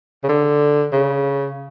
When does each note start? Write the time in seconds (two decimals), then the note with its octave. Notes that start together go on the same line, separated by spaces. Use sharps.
0.24 C#3
0.29 D3
0.92 C#3